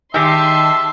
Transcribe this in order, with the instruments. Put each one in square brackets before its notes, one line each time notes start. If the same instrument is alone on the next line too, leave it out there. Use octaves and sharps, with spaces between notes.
[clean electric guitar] D#3 D#4 [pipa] G3 G#3 G4 [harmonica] E5 [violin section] A5 C6